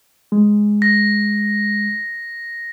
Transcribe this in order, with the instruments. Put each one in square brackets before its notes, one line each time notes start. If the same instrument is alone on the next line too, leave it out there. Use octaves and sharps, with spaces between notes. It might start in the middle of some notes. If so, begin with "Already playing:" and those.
[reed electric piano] G#3
[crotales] A#6